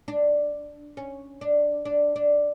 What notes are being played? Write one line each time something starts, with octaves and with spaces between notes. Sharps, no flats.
D4
C#4
D4
D4
D4